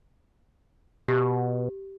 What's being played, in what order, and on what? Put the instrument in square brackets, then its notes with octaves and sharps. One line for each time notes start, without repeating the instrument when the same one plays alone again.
[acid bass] B2 [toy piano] G4